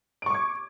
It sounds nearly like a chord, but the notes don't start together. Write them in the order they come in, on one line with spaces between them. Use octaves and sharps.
D7 C#6 D6 G#6